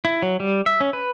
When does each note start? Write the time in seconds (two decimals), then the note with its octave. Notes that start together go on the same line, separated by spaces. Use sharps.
0.05 E4
0.22 F#3
0.40 G3
0.66 E5
0.81 C#4
0.93 B4